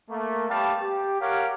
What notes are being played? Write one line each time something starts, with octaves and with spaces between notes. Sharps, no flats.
A3 A#3
G3 A3 B3 G4 F5 A5
G4
G4 A#4 C#5 F5 F#5